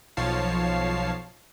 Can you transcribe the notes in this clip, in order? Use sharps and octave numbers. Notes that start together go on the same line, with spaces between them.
B1 F3 C#5 F5 A5 C7